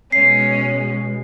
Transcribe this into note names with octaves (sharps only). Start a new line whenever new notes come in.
B2 G#3 C#4 C7